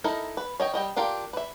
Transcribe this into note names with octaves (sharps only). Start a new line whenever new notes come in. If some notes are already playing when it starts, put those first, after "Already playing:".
D#4 E4 A4 A#4 D#5
B4
C#5 D#5 G5
G3 D#5 G5
D4 F4 G4 A#4
B4 E5